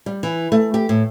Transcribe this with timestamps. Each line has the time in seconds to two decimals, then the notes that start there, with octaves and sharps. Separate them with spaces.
0.06 G3
0.23 E3
0.52 A3
0.74 G4
0.89 A2